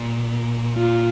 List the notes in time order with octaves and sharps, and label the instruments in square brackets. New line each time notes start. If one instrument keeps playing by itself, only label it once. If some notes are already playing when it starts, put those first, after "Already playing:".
Already playing: [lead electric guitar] A#2
[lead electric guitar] A#2 [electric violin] F4